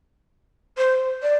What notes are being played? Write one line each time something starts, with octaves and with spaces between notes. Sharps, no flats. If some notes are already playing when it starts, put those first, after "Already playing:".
C5
D5